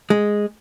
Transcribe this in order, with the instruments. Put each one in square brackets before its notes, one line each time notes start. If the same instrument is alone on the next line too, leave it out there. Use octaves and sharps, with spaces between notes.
[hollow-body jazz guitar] G#3